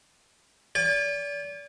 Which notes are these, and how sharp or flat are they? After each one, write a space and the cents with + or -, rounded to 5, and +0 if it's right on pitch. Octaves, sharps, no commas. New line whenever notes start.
D5 -35 G#5 -45